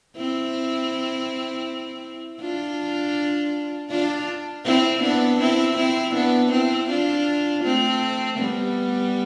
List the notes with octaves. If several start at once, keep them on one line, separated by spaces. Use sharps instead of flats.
C4 E4
D4 F4
D4 F4
C4 E4
B3 D4
C4 E4
C4 E4
B3 D4
C4 E4
D4 F4
A3 C4
G3 B3